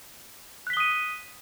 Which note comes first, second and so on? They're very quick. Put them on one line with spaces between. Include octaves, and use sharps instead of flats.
F#6 B6 G7 D#6 D#7